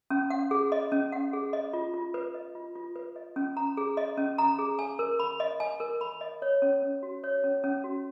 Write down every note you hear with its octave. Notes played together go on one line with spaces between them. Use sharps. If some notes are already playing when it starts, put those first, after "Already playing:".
C#4
F#5
G#4
D#5
C#4
F#5
G#4
D#5
F4
F4
B4
D#5
F4
F4
B4
D#5
C#4
A#5
G#4
D#5
C#4
A#5
G#4
G#5
A#4
B5
D#5
G#5
A#4
B5
D#5
C#5
C#4
C#4
F#4
C#5
C#4
C#4
F#4